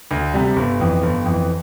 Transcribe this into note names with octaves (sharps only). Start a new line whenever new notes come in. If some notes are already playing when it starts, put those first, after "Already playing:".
D2
C3 G3
G1
F2 E3
G1
F2 E3